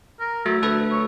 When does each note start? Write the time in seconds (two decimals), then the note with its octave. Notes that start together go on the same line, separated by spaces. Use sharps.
0.20 A#4
0.46 F#3 A3 E4
0.62 D2 A3 A4 B4
0.91 C#5